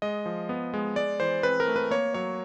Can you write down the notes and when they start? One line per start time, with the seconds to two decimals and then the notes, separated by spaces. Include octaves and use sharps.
0.02 G#3 D#5
0.26 F3
0.49 B3
0.74 G#3
0.96 G#3 D5
1.20 E3 C5
1.43 C4 B4
1.60 A#4
1.68 A3
1.76 B4
1.91 A#3 C#5
2.14 F#3 C#5